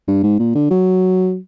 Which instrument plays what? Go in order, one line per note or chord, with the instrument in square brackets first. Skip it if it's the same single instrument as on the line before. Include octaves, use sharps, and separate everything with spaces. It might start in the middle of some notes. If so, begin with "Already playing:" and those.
[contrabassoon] G2
G#2
A#2
D3
F#3